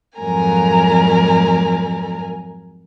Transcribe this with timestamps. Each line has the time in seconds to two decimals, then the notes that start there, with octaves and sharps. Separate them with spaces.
0.18 F2 G#2 F#3 A#4 G#5 A#5